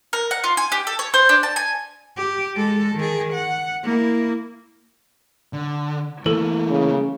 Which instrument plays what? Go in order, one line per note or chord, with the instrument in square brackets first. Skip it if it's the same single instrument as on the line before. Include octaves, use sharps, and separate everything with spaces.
[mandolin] A#4
F#5
F4
G#5
G4
A4
C#5
C5
D4
A5
G#5
[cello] G4
G#3 A4
D#3 G#4
F#5
A#3 E4
[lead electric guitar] D3
[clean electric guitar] E3 [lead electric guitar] A3 A#3 [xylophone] A4
[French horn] C#3